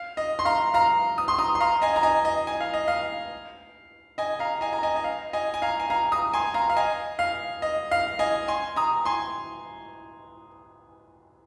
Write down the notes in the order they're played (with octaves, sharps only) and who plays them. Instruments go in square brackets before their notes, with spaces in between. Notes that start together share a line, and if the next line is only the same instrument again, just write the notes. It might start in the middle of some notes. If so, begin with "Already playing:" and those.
Already playing: [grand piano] F5
D#5
C6
F5 A#5
F5 A#5
D#6
C6
A#5 D#6
C6
F5 A#5
D#5 G#5
A#5
D#5 G#5
D#5
G#5
F5
D#5
F5
D#5 G#5
F5 A#5
D#5 G#5
A#5
D#5 G#5
D#5
F5
D#5 G#5
G#5
F5 A#5
G#5
F5 A#5
A#5 D#6
G#5 C6
F5 A#5
F5
D#5 G#5
F5
D#5
F5
D#5 G#5
G#5 C6
A#5 D#6
G#5 C6